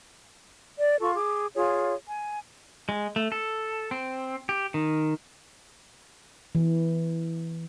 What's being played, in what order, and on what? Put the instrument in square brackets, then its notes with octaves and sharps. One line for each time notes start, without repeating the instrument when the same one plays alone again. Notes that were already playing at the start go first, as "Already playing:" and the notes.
[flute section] D5
F4 A4 C#6
G#4 D6
F4 G#4 C#5
G#5
[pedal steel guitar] G#3
A3
A4
C4
G4
D#3
[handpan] E3